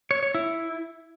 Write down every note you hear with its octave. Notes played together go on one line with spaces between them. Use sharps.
C#5
C#5
E4